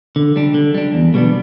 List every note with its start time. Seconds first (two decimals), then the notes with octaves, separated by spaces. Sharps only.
0.16 D3
0.36 G3 D4
0.54 D3
0.75 G3 D4
0.94 E2
1.14 B2 G3 B3 D4